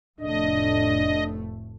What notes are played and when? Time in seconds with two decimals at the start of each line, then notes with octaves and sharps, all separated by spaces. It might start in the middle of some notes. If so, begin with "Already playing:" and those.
0.20 F1 A2 A3 D4 D#5